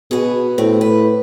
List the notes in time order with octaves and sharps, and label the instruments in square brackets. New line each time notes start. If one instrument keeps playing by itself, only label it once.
[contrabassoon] B2 [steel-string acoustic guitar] B3 G#4
[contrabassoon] A2 [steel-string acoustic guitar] C4
[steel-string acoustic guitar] B4